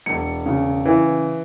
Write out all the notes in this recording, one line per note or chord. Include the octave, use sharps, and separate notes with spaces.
E1 C#7
C#3
E3